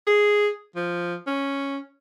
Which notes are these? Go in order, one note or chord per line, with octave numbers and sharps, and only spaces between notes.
G#4
F3
C#4